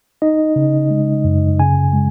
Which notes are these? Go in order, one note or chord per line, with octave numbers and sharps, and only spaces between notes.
D#4 D#5
C#3
G#3
F#2
C#3 G#5
G#3